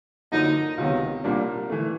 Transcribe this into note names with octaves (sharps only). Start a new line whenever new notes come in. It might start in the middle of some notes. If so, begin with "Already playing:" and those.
F#2 D3 F3 A#3 D#4
C#2 C3 D#3 F#3 B3
C2 A#2 G3 A#3 D4
E3 A3